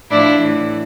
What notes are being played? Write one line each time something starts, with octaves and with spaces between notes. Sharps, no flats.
A2 F3 D4 E4
A2 E3